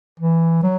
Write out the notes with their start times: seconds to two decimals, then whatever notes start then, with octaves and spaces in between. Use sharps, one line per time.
0.20 E3
0.63 F#3